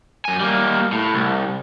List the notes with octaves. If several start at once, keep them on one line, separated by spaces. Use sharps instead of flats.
F#2 G#5
G3 A#3
A2
C2